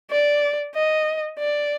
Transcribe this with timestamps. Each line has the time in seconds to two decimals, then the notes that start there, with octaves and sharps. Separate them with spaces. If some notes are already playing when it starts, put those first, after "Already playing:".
0.11 D5
0.75 D#5
1.39 D5